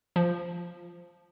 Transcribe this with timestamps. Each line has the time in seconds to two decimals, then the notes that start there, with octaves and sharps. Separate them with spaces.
0.16 F3